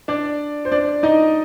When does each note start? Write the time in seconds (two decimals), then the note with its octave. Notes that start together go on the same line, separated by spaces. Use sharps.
0.08 D4 D5
0.65 C5
0.72 D4 D5
1.03 D#4 D#5